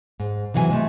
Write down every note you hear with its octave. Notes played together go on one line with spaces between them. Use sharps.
G#2
C3 E3 F#3 F5 G#5
G#3 A3